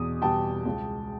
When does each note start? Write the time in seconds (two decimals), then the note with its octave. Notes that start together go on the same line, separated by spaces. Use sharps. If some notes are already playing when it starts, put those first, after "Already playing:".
Already playing: E2 B2 B3 D#6
0.22 B2 G3 B3 G5 A5
0.65 C#2